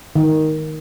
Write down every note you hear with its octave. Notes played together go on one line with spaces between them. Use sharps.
D#3